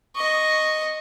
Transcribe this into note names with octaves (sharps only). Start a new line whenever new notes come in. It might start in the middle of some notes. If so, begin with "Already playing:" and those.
D#5 C#6